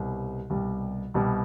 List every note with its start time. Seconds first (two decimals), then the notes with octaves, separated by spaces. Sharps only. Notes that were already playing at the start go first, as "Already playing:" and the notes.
Already playing: C2 B2 G3
0.50 C2 B2 G3
1.14 C2 B2 G3